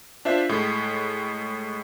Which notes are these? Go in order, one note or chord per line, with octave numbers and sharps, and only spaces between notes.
D4 F4 C5 E5
A2 G#3